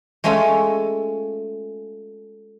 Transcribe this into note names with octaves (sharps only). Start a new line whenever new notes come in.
G#3 A3 C#4 F4 A4